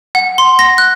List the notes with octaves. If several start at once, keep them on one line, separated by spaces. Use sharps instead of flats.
F#5
C6
A#6
F#6